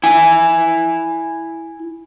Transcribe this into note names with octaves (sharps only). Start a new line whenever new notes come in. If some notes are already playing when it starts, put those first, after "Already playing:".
E4 G#5